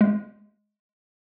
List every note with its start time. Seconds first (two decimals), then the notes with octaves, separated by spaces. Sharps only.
0.01 G#3